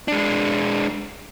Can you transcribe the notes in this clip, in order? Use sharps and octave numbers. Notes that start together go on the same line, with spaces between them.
G#3 D4